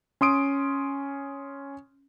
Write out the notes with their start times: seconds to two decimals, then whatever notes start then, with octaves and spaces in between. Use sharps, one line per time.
0.21 C#4 C6 D#6 D7